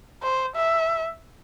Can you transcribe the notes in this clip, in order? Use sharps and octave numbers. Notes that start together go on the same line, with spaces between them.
C5
E5